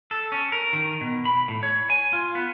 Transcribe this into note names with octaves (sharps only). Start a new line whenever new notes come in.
A4
C#4
A#4
D#3
B2
B5
A2
C#5
G#5
F4
B3